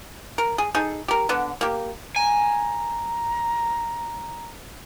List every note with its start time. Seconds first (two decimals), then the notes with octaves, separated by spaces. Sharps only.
0.38 A#4
0.58 G#4
0.74 D#4 G#4 A4
1.08 G4 A#4
1.29 D3 B3
1.61 A#3 G4
2.16 G#5 A#5